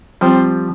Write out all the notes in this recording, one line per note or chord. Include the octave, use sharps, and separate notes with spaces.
F3 G3 C4